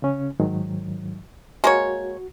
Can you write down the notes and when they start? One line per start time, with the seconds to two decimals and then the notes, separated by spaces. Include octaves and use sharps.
0.02 C#3 C#4
0.40 G#2 D#3 F#3
1.64 G#3 A#3 F#4 C#5